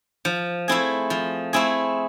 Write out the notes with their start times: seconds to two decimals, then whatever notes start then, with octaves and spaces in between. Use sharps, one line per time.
0.25 F3
0.68 A3 C4 E4 G#4
1.10 F3
1.53 A3 C4 E4 G#4